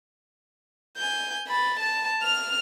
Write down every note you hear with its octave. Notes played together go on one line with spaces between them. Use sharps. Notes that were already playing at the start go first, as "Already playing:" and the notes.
G#5 G6
B5 A6
A5
F6 F7